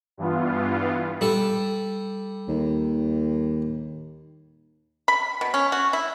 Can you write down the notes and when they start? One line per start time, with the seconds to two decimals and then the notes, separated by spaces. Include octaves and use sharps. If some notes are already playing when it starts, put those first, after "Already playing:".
0.17 G2 E3 B3 F4
1.21 G3 A4
2.48 D#2
5.08 B5
5.41 B2
5.54 C#4
5.72 F#4
5.93 E4